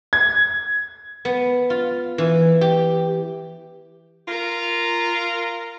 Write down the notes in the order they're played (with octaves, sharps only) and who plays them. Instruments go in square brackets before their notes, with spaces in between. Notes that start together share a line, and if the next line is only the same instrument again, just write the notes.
[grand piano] G#6
[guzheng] B3
F4
E3
G4
[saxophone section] F4 A#4